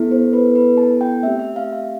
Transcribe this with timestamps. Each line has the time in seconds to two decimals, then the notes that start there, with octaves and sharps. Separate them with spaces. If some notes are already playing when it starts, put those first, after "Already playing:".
Already playing: B3 E4 A4
0.11 C5
0.33 B4
0.56 B4
0.77 A5
1.01 G5
1.23 A3 C4 G4 E5
1.39 E5
1.56 F5
1.73 F5